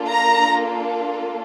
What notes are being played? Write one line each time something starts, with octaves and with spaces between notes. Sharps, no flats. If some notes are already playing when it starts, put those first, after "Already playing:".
Already playing: A#3 D4 F4 A4
A#5